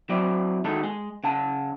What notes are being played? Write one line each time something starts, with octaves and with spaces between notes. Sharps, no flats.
F#3 C4 E4 D5
D#3 G#3 D#4 F#4 A4
G#3
C#3 F#5 A5